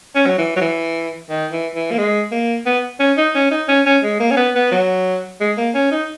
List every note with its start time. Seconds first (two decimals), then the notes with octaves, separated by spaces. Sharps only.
0.15 C#4
0.26 F#3
0.38 E3
0.56 F#3
0.61 E3
1.30 D#3
1.51 E3
1.75 E3
1.91 A#3
1.98 G#3
2.31 A#3
2.66 B3
3.00 C#4
3.17 D#4
3.35 C#4
3.51 D#4
3.68 C#4
3.86 C#4
4.03 G#3
4.20 A#3
4.31 C#4
4.37 B3
4.55 B3
4.72 F#3
5.40 G#3
5.57 A#3
5.75 C#4
5.91 D#4